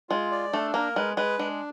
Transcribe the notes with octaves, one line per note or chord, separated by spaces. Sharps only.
G#3 F4
D5
A3 D4
A#3 A#4
G#3 B4
G#3 B4
G#3 D4